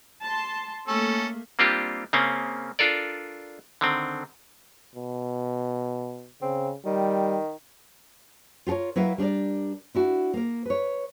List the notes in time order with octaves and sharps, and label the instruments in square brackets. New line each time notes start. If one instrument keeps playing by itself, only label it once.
[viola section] A5 C6
[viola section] A3 A#3 [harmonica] C#4 A4 E6
[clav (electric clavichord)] G3 A#3 C4 D4 F4 G4
C#3 A#3 C4 C#4
D4 F4 A4 A#4 D5
D3 D#3 C4
[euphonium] B2
[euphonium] C#3 [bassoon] C4
[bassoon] D#3 [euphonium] G3
[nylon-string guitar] F4 G4 A4 A#4 C#5
F#3 E4 A#4 B4 E5 F5
G3 D4 A#4 D5
D4 E4 F#4
A#3 A#4
B4 C#5